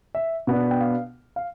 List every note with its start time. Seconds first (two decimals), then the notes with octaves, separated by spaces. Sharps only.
0.15 E5
0.47 B2 B3 D4
0.71 G5
0.81 F5
1.36 F5